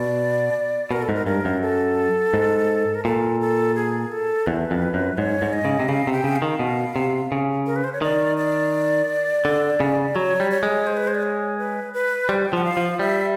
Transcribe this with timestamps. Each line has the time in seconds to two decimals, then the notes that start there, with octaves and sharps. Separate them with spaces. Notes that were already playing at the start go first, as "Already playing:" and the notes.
Already playing: B2 D5
0.91 B2 A#4
1.02 A4
1.09 G#2
1.15 A#4
1.26 G2 A#4
1.45 F#2
1.62 A4
2.34 G#2
2.95 A#4
3.05 A#2 A4
3.41 A4
3.75 G#4
4.12 A4
4.46 E2 B4
4.71 F2
4.94 F#2
5.18 G#2 C#5
5.42 G#2
5.53 D#5
5.65 C#3
5.80 C3
5.89 C#3 F5
6.07 C3
6.12 G5
6.24 C#3
6.36 F5
6.42 D#3
6.59 B2
6.96 C3
7.32 C#3
7.66 A#4
7.76 B4
7.84 C5
7.93 C#5
8.02 D#3 D5
8.38 D5
9.45 D3
9.80 C#3
10.15 F#3 C#5
10.40 G3
10.51 C#5
10.63 G#3
10.87 C5
10.97 B4
11.07 C5
11.15 D5
11.22 C#5
11.58 B4
11.94 B4
12.29 G3 C5
12.45 G5
12.53 F3 F#5
12.64 F5
12.77 F3
12.99 G3 E5